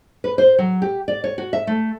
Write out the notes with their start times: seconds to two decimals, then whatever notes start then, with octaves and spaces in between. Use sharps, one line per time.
0.24 B4
0.38 C5
0.59 F#3
0.82 G4
1.08 D5
1.24 C#5
1.38 F#4
1.53 E5
1.67 A3